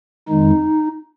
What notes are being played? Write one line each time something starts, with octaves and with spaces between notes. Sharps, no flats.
F2 D#3 G#3 D#4